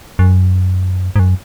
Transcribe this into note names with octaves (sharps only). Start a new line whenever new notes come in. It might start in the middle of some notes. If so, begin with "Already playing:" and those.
F#2
G#2
F#2